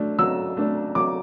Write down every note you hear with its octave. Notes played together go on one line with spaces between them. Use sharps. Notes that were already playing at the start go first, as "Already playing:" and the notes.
Already playing: F#3 A3 D4
F#3 E6
A3 D4
F#3 D6